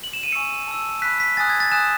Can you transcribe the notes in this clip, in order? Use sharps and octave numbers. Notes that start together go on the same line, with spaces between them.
F#7
E7
D#7
G#5 C#6 E6 C#7
A5 E6
B5 F#6 B6
B6
G#5 D#6 F#6 A6
G#6
A6
G#5 D#6 F#6 E7